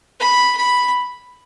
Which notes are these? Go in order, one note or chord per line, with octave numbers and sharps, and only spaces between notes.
B5
B5